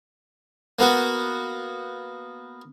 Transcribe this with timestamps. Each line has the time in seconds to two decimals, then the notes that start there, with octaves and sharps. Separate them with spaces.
0.79 A#3 B3 F#4